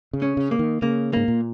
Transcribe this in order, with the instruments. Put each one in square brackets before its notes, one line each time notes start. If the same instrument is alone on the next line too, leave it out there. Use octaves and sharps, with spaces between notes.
[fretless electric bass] C#3
[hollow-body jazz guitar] C#4
[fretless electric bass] C#3
[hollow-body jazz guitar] A#3
[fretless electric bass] D#3
[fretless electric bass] C#3 [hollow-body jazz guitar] A#3
[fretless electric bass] G#2 [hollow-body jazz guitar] A#3
[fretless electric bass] A#2